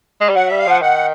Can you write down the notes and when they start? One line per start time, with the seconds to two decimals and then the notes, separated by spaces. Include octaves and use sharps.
0.21 G#3
0.29 G3
0.35 F#3 F#5
0.47 G3 E5
0.59 F5
0.66 F3 F#5
0.82 D#3 F#5